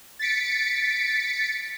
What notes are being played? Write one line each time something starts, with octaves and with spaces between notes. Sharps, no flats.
A6 B6 C#7 D7